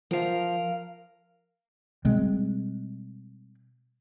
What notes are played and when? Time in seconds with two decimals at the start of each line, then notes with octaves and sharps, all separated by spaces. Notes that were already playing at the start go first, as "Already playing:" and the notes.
0.11 F3 A#4 F5
2.05 B2 G3 G#3 C4